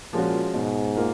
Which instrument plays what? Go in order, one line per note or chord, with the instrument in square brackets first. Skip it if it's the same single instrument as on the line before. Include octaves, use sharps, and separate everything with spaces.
[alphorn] A#2 [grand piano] F3 G#3 C#4 F#4
[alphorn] G#2 [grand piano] B2
[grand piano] A#3 F4 A#4